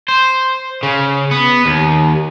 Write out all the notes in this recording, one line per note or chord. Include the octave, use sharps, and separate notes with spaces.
C5
C#3
B3
D#2